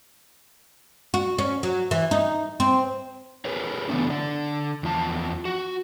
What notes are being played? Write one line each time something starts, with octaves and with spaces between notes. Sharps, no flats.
F#4
C#4
F#3
E3
D#4
C4
G#4 A#4 B4 C#5
C#3 E3 A3 B3 D4
D3 D5
E2 F3 A5
F#4